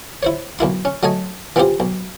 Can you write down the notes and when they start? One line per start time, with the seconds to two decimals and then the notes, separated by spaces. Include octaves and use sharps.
0.23 E4 C5 C#5
0.59 B1 A#3 E4 C6
0.85 C#4
1.03 F#3 A3 D#5 G#5
1.56 E3 B3 C4 F4 G4 C5
1.80 B1